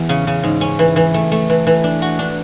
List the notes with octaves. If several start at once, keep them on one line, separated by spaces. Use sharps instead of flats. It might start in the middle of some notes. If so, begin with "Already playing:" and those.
Already playing: E2
C#3
C#3
G#2
C#4
E3
E3
A3
A3
E3
E3
D4
F#4
D4